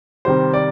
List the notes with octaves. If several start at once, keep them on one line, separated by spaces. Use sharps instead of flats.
C3 D#3 G3 C5
D5